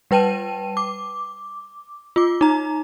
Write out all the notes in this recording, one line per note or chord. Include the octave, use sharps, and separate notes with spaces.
G3 B4 G5 A5 D#7
D6
F4 D6
D#4 A#5